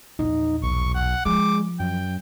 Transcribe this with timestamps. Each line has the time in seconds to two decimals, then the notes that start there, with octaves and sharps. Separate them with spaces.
0.19 A#1 E2 D#4
0.63 B1 C#6
0.95 F#5
1.26 F3 G#3 D6
1.80 F#2 G5